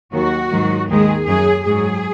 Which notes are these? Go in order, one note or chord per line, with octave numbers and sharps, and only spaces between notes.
D#2 D#3 F#3 F#4
G#2 D#3 F#3
D#2 D#3 G#3 G#4
F#2 F#3 G#4
G#2 F#3 G#4